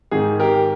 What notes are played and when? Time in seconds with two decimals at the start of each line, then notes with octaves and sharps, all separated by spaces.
0.11 G#2 D#3 G#4
0.40 G4 A#4